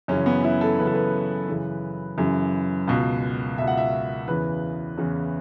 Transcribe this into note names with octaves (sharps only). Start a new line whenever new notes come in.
F#2 C#3 E3 C#4
B3
E4
A4
F#2 C#3 E3 B4
A4
B4
F#2 C#3 E3
F#2 C#3 E3
C#2 B2
C#2 B2 E5
F#5
E5
E2 C#3 E3 B4
E2 C#3 E3